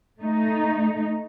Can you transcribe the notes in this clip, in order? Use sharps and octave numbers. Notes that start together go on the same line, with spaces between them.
A3 D#4